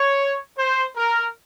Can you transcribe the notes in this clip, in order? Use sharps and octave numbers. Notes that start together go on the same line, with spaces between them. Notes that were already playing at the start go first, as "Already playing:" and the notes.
Already playing: C#5
C5
A#4